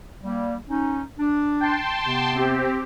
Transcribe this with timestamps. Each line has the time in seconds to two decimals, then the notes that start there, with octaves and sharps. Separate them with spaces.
0.24 G3 A#3
0.69 C#4 D#4
1.19 D4
1.60 G5 A5 C6
2.05 C3 B3
2.35 C4 G4